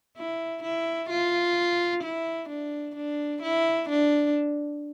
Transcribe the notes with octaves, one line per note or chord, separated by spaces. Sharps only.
E4
E4
F4
E4
D4
D4
E4
D4